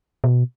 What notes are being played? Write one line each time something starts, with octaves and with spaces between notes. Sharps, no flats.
B2